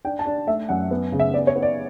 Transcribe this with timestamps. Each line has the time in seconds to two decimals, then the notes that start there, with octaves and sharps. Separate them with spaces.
0.05 D4 G5
0.19 A5
0.26 D4
0.47 A3 E5
0.69 F#2 F#5
0.91 B3
1.12 C#3
1.20 E5
1.33 B3 D5
1.47 C#5
1.55 B3
1.62 D5